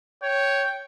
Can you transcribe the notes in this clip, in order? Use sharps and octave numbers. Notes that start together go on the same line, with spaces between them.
C#5 G5